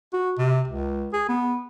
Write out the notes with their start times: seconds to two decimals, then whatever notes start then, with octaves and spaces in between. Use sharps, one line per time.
0.13 F#4
0.38 C3
0.68 C#2
1.13 G#4
1.28 B3